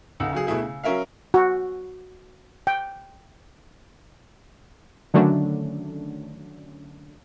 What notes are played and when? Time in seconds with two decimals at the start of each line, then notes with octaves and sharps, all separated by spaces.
0.20 F1 C#3 D#4 F#5 E6
0.33 C#3 F#3 G#4
0.47 B2 A3 E4 G#4
0.62 C#3
0.84 F#3 C#4 A#4 E5 F5
1.34 F#4
2.67 G5
5.14 D3 D#3 F#3 A3 C#4 D4